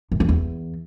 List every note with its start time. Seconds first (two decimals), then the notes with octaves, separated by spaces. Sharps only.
0.12 F#2
0.20 F2
0.29 E2